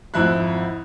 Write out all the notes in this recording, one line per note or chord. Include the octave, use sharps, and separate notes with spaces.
G#1 F2 E4 F#6